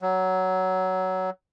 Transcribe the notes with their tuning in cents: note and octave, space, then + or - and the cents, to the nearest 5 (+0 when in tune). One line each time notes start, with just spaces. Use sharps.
F#3 +15